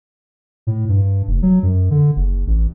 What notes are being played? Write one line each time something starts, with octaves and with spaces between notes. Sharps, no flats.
A2
G2
F1
F#3
F#2
D3
F#1
A1